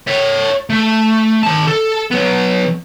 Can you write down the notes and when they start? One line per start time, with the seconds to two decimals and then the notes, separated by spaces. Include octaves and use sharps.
0.07 C#5 E5
0.70 A3
1.43 D#3 A5
1.67 A4
2.11 F#3 B3